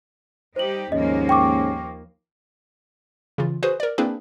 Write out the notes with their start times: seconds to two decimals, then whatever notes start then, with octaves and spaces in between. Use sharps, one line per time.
0.56 G3 D#4 G4 C5 F#7
0.92 D#2 G#2 F3 A#3 C#4 D#5
1.29 G5 C#6 D6
3.38 C#3 E3 F4
3.63 F#4 G#4 B4 C5 D#6
3.80 A#4 D5
3.98 A#3 C4 D4 E4 G#4 B4